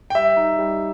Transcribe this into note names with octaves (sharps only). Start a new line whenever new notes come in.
G5
G3 E5
D#4
G3